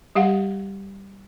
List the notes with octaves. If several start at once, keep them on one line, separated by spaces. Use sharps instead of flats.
G3 G4 F5 F#5